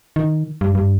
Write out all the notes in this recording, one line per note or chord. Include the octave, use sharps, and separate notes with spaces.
D#3
G2
G2